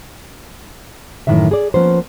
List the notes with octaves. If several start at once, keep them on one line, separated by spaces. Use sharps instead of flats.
F#2 A2 C3 D#3 E3 E5
G#4 D5
F3 A#3 B3 C#4 C5